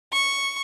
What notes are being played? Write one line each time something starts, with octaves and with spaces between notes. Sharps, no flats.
C#6